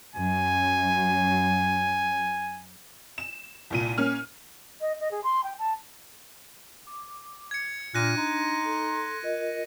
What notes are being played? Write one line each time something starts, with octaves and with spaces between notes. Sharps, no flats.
F#2 F#3 G#5
E7
C2 A#2 D#7
A#3 C#4 F6
D#5
D#5
G#4
C6
G5
A5
D6
G#6 C#7
A#2 D4 F6 F#6 A#6 D#7
D#4 C6
A4
F4 A#4 D#5